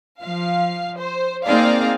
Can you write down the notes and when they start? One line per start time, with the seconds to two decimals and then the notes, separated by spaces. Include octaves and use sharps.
0.20 F3 F5
0.98 C5
1.45 A#3 C4 D#4 G#4 D5 F5